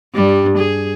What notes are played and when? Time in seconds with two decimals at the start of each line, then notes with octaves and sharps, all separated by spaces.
0.15 G2 G3
0.58 G#4